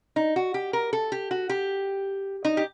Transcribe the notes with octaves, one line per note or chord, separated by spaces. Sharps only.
D#4
F#4
G4
A#4
A4
G4
F#4
G4
D#4
G4